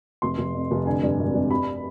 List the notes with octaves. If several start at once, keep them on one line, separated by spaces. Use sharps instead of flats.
F1 C6
F1
F2
F1
D3 G#5
G2
G#1
G2
C3 B5